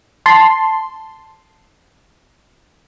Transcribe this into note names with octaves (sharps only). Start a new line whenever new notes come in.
A5 C6